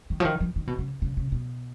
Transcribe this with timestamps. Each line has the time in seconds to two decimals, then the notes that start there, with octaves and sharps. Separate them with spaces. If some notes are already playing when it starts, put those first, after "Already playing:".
0.10 D#3
0.20 F3
0.25 D#3
0.40 F3
0.56 D#3
0.67 B2
0.79 C#3
1.02 C#3
1.17 C#3
1.32 B2